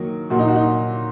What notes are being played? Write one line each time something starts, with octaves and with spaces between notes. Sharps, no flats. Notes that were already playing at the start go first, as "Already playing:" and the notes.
Already playing: D#3 F#3 A#3
A#2 F#3 A#3 F#4
D#4
F#4
D#4